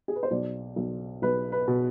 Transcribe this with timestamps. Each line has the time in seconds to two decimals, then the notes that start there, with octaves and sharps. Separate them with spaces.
0.08 G#4
0.15 B4
0.23 C5
0.31 B1 D5
0.76 B1
1.22 B1 B4
1.52 B4
1.68 B2